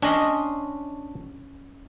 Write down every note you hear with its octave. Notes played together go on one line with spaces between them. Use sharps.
C#4 D4 D#5 C6